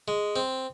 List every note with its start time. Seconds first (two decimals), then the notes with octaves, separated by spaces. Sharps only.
0.08 G#3
0.36 C4